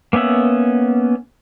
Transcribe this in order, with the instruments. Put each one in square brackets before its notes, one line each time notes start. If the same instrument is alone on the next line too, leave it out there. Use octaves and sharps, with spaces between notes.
[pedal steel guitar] A#3 B3 C#4 E5 F#5